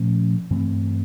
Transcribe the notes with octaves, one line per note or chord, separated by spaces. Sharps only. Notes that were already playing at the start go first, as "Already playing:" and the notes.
Already playing: A#2 F3 A3 C#4
G2 E3 A3 C4